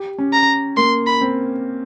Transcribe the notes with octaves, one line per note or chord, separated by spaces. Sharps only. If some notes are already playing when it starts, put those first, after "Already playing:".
Already playing: G4
C#4
A#5
A#3 C6
B5
C4